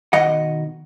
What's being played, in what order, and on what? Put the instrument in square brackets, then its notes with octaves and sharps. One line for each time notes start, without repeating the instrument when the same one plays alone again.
[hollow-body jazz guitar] B2 D#3 D#5 F#5